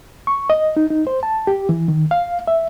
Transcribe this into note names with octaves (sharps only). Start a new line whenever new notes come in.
C#6
D#5
D#4
D#4
C5
A5
G4
E3
D#3
F5
E5